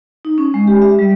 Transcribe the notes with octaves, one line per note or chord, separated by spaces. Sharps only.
D#4
C#4
G#3
G4
E5
G3